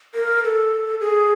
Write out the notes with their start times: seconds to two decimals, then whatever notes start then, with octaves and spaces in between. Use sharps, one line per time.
0.15 A#4
0.44 A4
1.00 G#4